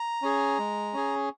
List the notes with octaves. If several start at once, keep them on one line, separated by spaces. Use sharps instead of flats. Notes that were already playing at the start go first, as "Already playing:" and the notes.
Already playing: A#5
C#4 G#4
G#3
C#4 G#4